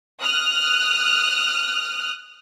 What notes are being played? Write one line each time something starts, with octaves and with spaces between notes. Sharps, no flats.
D#6 F6 F#6